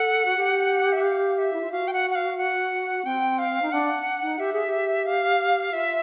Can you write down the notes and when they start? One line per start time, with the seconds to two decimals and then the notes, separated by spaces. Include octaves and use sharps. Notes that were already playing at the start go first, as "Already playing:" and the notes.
Already playing: A4 F#5
0.25 F#4
0.37 G4
0.93 E5
1.04 F5
1.38 E5
1.53 E4
1.61 F4
1.71 F#4 F5
1.88 G5
1.93 F#5
2.10 F#5
2.15 F5
2.38 F#5
3.05 C4 G5
3.38 F5
3.62 D#4
3.72 D4 F#5
4.22 D#4
4.39 G4 E5
4.53 G#4
4.67 G4
5.06 F5
5.73 F4 E5